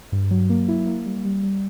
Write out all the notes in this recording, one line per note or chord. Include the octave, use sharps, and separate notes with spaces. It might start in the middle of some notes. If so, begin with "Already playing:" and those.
G2
F#3
A#3
E4
A#3
G3
G3
G3